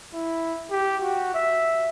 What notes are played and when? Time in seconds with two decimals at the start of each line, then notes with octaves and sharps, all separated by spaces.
0.13 E4
0.71 G4
1.02 F#4
1.35 E5